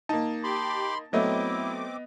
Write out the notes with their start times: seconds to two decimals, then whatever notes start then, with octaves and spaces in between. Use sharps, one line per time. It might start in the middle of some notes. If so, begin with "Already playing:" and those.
0.09 A#3 D#4 A5
0.44 G4 B5 C6 D6
1.13 F#3 A3 B3 C4 E4 D#5 D6